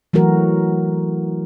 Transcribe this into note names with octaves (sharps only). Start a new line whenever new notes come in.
E3 F#3 A3 F#4 A#4